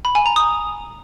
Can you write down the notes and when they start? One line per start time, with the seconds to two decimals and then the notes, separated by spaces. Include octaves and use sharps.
0.05 B5
0.15 G#5
0.26 A#5
0.36 D#6